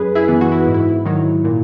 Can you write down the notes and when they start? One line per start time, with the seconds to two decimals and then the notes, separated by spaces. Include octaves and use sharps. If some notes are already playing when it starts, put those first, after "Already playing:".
Already playing: F#2 G#4 B4
0.15 E4 G#4
0.28 E3 B3
0.41 F#4
0.52 E4
0.67 G#2
0.74 E4
1.05 D#3 F#3
1.44 A#2